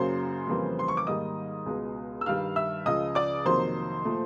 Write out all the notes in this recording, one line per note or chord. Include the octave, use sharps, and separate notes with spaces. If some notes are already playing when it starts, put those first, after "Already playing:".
Already playing: F#2 C#3 F#3 A#3 C5 C6
F2 C#3 E3 G3 A#3
C6
C#6
D6
G#2 D#3 G3 A#3 D#5 D#6
C#2 B2 G#3
E6
G2 D#3 G3 F5 F6
E5 E6
C#2 C#3 F3 D#5 D#6
D5 D6
F2 C3 D#3 F#3 A#3 C5 C6
A#2 F3 A3